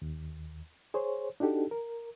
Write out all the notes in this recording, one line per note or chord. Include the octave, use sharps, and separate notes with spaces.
D#2
G#4 C5 C#5
D4 D#4 F#4 G4 A4
A#4